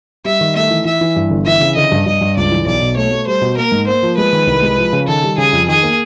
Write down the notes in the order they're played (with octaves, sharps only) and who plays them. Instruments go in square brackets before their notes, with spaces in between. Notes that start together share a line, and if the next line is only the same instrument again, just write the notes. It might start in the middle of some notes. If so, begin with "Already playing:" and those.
[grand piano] G3 [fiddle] E5
[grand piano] D#3
[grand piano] A3 [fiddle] E5
[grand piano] E3
[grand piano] E3 [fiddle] E5
[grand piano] E3
G2
G1
[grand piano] E3 [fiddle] E5
[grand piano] C#3
[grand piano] D3 [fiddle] D#5
[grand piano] G2
[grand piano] G2 [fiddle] D#5
[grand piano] G2
[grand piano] C#2 [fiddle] D5
[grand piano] E3
[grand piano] B1 [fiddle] D5
[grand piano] B2
[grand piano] A3 [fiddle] C#5
[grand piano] A3
[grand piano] G3 [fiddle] C5
[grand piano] B2
[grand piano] A#3 [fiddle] A#4
[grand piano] G#2
[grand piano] A#3 [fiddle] C5
[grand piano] F3
[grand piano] G#3 [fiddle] B4
[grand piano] D#3
C2
G#3
F3
C#3
[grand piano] D#3 [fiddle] A4
[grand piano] G3
[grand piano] C#3 [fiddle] G#4
[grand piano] F2
[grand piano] D#3 [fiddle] G#4
[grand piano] A#3